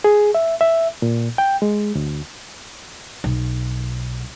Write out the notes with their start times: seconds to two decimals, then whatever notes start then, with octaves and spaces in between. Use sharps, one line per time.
0.04 G#4
0.34 E5
0.61 E5
1.02 A#2
1.38 G5
1.62 G#3
1.95 D2
3.24 B1